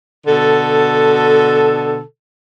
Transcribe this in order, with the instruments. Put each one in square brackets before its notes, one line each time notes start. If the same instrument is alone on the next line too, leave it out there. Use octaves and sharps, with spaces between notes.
[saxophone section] B2 D3 A4